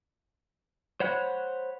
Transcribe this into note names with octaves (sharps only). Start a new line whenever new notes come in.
C5 C#5 F#5 B5 F#6